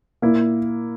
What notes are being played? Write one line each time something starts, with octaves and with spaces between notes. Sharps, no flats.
A#2 A#3 E4